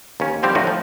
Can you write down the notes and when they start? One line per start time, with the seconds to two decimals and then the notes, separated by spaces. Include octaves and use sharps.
0.20 D#2 C#4
0.43 D3 F3 G3 C4 G4
0.55 A2 F3 A3 D4 D#4 F#4
0.67 A2 F3